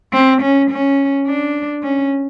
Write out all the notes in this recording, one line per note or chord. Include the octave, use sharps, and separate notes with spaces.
C4
C#4
C#4
D4
C#4